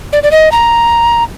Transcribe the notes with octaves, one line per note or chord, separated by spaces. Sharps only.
D5
D5
D#5
A#5